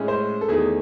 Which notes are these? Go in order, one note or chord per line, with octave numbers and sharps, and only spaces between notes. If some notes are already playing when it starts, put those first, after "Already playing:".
Already playing: A2 G#3 C#4
C5
A4
E2 D#3 A3 G#4